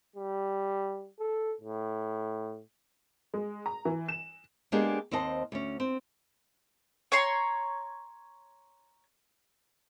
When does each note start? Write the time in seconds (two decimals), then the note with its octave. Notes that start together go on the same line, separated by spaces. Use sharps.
0.16 G3
1.20 A4
1.61 A2
3.34 G#3
3.66 A#5
3.85 E3
4.08 E7
4.72 G#3 A#3 B3 D4 G4 G#4
5.11 D#2 C4 C5 D#5 A5
5.52 D2 C#4
5.80 C4
7.12 C#5 A#5 C6